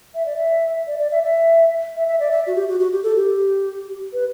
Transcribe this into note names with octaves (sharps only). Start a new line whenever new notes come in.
E5
D5
E5
D5
D5
E5
E5
E5
E5
D5
E5
F#4
G4
F#4
F#4
G4
A4
G4
B4